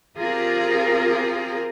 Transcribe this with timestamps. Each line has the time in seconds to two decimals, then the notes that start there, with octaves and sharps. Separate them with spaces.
0.18 C4 F4 G4 G#4 A#4